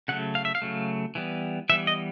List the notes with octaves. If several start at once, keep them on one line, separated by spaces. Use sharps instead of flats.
C#3 F#3 A3 F#5
F5
E5
F5
C#3 F#3 A3
E3 G3 B3
E3 G3 B3 E5
D#5